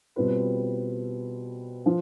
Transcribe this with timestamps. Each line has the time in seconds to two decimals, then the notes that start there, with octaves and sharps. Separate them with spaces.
0.16 B2 G3 C4 F4 B4
1.86 F3